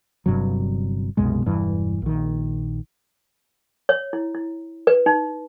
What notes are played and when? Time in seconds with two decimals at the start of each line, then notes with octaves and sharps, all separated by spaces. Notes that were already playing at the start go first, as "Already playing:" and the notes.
0.26 G1 G2 C3 F#3
1.17 C2 F#2 B2 G#3
1.46 E1 G2 E3
2.02 A#1 D#3
3.89 C#5
4.13 E4
4.35 E4
4.87 B4
5.06 D#4